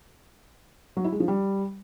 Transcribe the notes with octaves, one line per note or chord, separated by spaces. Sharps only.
F#3
E4
G#3
F3
G3